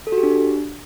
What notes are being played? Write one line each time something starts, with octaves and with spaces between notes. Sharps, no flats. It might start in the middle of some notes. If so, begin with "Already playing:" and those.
A4
F#4
G4
D4